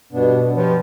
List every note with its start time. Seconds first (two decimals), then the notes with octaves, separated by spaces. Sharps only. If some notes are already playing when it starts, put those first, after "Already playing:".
0.12 G2 B2 B3 D4
0.56 F3 G4 B4 C#5